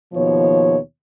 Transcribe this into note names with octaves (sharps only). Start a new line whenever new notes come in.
D#2 B2 F3 C#5